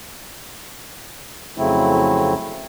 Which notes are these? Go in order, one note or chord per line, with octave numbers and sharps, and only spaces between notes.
F2 C#3 F#3 A3 C4 E4